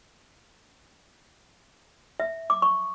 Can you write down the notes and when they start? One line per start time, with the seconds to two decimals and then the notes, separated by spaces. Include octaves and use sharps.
2.20 E5
2.50 D6
2.62 C#6